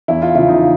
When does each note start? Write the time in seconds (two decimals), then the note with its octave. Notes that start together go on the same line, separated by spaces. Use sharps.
0.08 E2 E4
0.22 F4
0.35 C#3 F3 E4
0.49 D#4